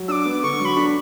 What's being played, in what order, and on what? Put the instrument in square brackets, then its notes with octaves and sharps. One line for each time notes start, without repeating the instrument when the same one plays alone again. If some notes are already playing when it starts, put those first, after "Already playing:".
Already playing: [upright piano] F#3
[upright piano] D4 [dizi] D6 E6
[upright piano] B3
[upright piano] D3 [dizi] C#6
[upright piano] F#3
[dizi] B5
[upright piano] D4